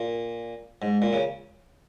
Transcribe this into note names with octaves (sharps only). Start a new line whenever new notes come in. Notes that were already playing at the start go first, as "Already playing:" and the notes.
Already playing: A#2
G#2
A#2
C#3